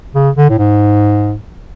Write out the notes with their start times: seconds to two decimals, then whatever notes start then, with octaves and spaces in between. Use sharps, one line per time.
0.15 C#3
0.36 D3
0.50 A2
0.58 G#2